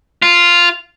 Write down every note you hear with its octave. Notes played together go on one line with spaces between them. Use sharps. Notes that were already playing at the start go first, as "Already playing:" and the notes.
F4